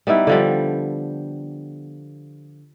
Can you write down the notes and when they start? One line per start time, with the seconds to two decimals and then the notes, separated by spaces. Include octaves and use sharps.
0.07 G3 B3 D#4 E4
0.27 D3 F3 G3